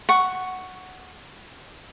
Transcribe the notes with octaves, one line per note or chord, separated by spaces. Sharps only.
F#5 C#6